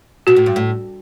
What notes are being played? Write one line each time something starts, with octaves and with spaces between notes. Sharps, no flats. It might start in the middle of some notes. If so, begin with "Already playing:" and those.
B2 F#4
A2
G2
A2